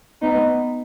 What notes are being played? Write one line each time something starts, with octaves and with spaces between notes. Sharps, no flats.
B3 D#4